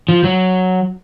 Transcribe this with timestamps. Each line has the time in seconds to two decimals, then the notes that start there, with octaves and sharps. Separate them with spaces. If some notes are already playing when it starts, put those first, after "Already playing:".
0.09 F3
0.24 F#3